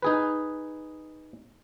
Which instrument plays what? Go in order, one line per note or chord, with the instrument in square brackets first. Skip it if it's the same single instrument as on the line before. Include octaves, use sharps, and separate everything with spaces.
[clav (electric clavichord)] D#4 G#4 B4